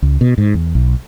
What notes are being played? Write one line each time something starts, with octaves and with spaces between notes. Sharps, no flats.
C#2
B2
G#2
E2
B1